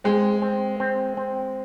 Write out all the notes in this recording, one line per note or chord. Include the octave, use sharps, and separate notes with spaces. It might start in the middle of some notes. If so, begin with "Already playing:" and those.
G#3 C4
C4
C4
C4